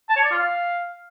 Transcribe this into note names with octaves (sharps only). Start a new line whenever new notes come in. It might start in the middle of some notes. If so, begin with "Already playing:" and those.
A5
C#5
D5
F4
F5